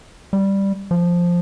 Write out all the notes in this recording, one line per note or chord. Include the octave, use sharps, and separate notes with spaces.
G3
F3